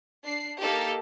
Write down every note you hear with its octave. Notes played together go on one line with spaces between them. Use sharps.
D4 C7
A#3 D#4 G4 A4